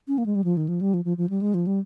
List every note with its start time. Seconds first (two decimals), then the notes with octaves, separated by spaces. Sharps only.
0.08 C#4
0.18 A#3
0.26 G#3
0.35 G3
0.44 F3
0.57 D#3
0.68 F3
0.81 G3
0.94 F3
1.05 F3
1.17 F3
1.30 G3
1.41 G#3
1.54 F3
1.67 G3